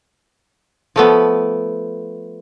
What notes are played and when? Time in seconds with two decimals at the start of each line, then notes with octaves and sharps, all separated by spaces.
0.96 F3 A3 B3